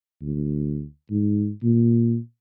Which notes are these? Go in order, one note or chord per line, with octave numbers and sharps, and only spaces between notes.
D2
G#2
A#2